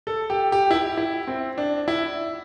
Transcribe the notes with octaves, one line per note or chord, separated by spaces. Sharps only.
A4
G4
G4
E4
G4
E4
C4
D4
E4